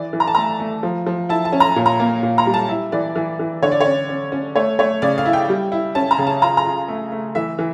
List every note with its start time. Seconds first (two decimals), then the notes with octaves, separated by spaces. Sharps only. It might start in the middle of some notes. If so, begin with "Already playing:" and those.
Already playing: E3 D5
0.13 E3
0.20 A#5
0.27 A5
0.35 A3 A#5
0.60 A3
0.83 F3
1.06 F3
1.29 E4 A5
1.45 A5
1.53 C#4
1.60 A#5
1.76 A#2
1.86 A#5
2.00 A#3
2.23 A#2
2.38 A#5
2.46 G3
2.54 A5
2.69 E4
2.92 E3 D5
3.16 E3
3.39 E3
3.62 D3 C#5
3.72 D5
3.81 C#5
3.86 C#4
4.09 C#4
4.32 C#4
4.56 A3 C#5
4.79 A3 C#5
5.02 C#3 D5
5.18 F5
5.25 E4
5.33 G5
5.49 G3
5.72 E4
5.95 C#4 A5
6.11 A#5
6.19 C#3
6.27 A5
6.42 F4 A#5
6.57 A#5
6.65 F4
6.88 A3
7.12 A3
7.35 E3 E5
7.59 E3